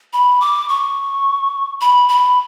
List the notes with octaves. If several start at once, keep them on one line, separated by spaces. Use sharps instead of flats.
B5
D6
C#6
B5
B5